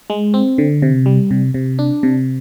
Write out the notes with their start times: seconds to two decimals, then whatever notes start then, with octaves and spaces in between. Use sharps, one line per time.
0.10 G#3
0.34 C4
0.58 D3
0.82 C3
1.06 G3
1.31 C3
1.54 C3
1.79 D4
2.03 C3